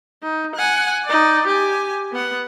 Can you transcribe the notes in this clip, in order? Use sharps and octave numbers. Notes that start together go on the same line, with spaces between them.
D#4
F#5 G#5
D#4 D5
G4 G#5
B3 F#5